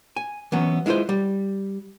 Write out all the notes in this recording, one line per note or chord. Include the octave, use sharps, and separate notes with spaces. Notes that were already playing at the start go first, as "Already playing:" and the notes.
G#5
E3 F#3 B3 C#4
G#3 E4 F4 B4 C5
G3